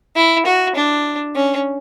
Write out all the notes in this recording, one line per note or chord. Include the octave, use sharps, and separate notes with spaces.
E4
F#4
D4
C#4